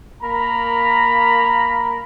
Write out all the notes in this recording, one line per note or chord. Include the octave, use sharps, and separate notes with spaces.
A#3 A#4 A#5 B5